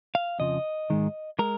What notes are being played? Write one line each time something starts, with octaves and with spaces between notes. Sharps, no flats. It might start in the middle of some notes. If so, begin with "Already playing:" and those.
F5
F2 C#3 F3 D#5
G#2 D#3 G#3
G#3 A#4